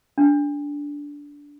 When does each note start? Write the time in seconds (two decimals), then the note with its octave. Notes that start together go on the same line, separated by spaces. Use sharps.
0.18 D4